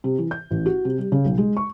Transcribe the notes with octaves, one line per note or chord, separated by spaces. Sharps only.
C3
E3
G6
A1
F#4
C3
G3
C#3
B1
G#3
C#6